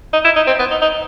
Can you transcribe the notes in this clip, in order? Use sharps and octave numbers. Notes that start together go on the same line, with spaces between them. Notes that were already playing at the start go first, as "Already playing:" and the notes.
D#4
E4
D#4
C4
B3
D#4
D#4